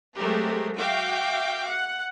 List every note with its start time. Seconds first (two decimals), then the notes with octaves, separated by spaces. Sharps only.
0.16 F#3 G#3 A3 C4 G4 A#4
0.77 F#4 E5 F5 G5 D6
1.66 F#5